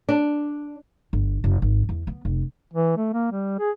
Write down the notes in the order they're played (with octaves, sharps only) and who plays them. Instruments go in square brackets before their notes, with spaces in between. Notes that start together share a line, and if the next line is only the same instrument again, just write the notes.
[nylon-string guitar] D4
[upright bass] G1
F#1
G#1
E2
B3
F1
[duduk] E3
A3
A#3
G3
G#4